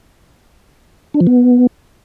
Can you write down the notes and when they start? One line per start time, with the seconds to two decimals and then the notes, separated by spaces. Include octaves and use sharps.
1.14 D4
1.20 F3
1.27 B3